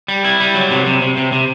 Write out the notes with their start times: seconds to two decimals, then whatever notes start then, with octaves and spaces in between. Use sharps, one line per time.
0.08 G3
0.25 E4
0.40 G3
0.55 F#3
0.71 C3
0.86 C3
1.02 C3
1.17 C3
1.32 C3